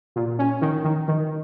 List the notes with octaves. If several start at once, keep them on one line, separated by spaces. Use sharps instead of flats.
A#2
C#4
D#3
D#3
D#3